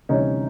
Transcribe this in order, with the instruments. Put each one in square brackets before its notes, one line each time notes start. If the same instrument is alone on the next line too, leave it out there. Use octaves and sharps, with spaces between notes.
[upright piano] D2 C3 E3 G3 C#4 D#4